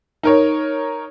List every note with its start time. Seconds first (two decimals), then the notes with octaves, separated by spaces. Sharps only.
0.23 D#4 A#4 C#5